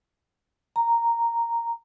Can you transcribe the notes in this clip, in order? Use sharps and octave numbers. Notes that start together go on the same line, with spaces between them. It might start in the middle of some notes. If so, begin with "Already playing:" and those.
A#5